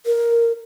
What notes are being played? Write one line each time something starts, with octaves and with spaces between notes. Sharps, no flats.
A#4